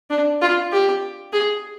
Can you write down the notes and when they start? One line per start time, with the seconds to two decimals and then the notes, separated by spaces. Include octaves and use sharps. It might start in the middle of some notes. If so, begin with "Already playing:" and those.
0.10 D4
0.41 F4
0.72 G4
1.32 G#4